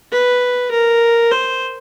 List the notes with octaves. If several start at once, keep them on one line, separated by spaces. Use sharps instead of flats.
B4
A#4
C5